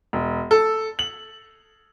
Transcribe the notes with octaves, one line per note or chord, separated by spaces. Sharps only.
E1
A4
F#7